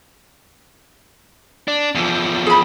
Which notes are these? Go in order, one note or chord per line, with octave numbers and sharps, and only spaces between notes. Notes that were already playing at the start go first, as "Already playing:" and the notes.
D4
E2 F3
G#4 B5